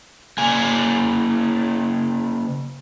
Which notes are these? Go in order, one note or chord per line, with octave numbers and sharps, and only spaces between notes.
C#3 A#3 G#5